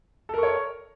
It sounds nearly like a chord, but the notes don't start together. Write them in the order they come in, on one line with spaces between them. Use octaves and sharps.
A4 A#4 C#6 C#5